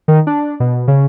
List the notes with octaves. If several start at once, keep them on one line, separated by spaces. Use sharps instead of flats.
D#3
D4
B2
C#3